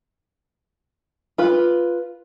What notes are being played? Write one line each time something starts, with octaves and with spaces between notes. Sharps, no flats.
F4 B4